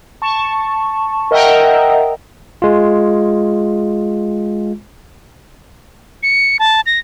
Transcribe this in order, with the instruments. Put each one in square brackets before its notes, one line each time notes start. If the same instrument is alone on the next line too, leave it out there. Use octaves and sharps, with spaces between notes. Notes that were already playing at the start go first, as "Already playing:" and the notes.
[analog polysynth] A5 C#6
A#4 D#5 E5 F#5 G5 A#5
[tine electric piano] G#3 F4
[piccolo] C#7
A5
A#6